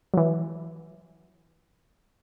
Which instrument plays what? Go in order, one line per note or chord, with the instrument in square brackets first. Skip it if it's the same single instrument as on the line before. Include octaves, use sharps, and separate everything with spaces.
[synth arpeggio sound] E3 F#3